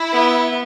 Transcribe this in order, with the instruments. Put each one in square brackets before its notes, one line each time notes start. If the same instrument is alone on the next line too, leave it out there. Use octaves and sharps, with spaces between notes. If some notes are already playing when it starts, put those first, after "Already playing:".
Already playing: [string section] E4
[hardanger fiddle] B3